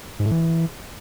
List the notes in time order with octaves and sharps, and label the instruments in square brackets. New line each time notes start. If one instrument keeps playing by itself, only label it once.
[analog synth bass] G#2
A2
E3